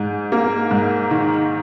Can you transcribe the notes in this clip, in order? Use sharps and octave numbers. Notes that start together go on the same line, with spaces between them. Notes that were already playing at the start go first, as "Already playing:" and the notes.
Already playing: G#2
A#3
G#2
D#3